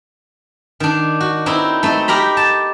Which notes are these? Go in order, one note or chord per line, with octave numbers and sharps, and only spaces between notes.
D#3 D4
F#4
C4 D#4 E4
A3 C4 D#4
G4 A#4 A#5 B5
A5